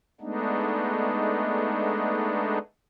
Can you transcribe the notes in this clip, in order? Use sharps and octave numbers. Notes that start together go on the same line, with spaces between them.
G#3 A3 B3 D4 D#4